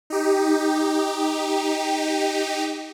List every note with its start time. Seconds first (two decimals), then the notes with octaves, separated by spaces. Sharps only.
0.10 D#4 G4